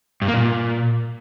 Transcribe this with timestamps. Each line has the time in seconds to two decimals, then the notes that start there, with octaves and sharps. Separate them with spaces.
0.22 G2
0.28 A#3
0.34 A#2